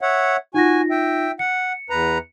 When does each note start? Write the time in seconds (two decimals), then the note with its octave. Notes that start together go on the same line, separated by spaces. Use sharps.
0.01 C#5 E5 F#5
0.54 D#4 F4 F#4 G#5 A#6
0.90 E5 G5
1.39 F#5 C#7
1.90 E2 B4 A#5